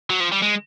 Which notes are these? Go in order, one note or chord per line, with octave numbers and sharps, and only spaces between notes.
F#3
F3
G3
G#3